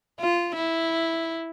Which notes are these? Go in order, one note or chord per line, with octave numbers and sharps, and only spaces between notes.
F4
E4